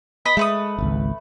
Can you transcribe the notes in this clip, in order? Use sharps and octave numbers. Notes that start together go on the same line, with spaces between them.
B4 D#5 B5
G#3 A3 B4 D#6
D#1 G#1 C#2